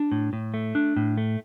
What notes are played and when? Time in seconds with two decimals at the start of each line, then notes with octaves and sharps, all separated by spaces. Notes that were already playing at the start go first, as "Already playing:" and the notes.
Already playing: D4
0.12 A2
0.33 A2
0.54 A3
0.75 D4
0.96 A2
1.18 A3